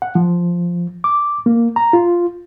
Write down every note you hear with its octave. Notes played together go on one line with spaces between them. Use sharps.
F#5
F3
D6
A#3
A#5
F4